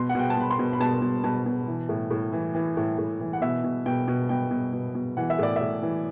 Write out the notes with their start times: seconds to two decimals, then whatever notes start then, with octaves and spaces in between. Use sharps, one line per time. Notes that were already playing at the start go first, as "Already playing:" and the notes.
Already playing: B2 C6
0.09 F#5
0.15 B2 G5
0.30 A5
0.37 B2 B5
0.51 C6
0.59 B2
0.73 B5
0.80 B2 A5
1.02 B2
1.24 B2 A5
1.46 B2
1.67 E3
1.89 A2
2.11 A2
2.33 E3
2.55 E3
2.77 A2
2.98 A2
3.21 E3
3.33 F#5
3.42 B2 E5
3.64 B2
3.86 B2 G5
4.08 B2
4.29 B2 G5
4.51 B2
4.73 B2
4.95 B2
5.17 E3 F#5
5.30 E5
5.39 A2 D5
5.56 E5
5.61 A2
5.83 E3